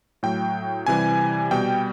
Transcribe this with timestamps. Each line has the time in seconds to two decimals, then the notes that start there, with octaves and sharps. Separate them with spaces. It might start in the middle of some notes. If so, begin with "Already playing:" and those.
0.23 A2 F#3 G5
0.86 C3 E3 G3 G#5
1.51 B2 G3 G5